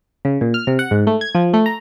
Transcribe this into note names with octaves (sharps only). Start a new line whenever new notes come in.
C#3
A#2
F6
C3
F#5
G#2
A3
G#6
F3
A3
A#5